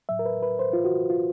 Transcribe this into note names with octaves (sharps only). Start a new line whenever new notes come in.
A2 F#3 E5
A#4
B4
B4
C5
F4
F#4
F4